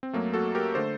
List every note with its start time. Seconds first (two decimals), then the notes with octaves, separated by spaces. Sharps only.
0.03 C4
0.13 F#2 F#3 A3 A#3
0.34 F#4 A4
0.55 G4 A#4
0.75 D3 A3 A4 C5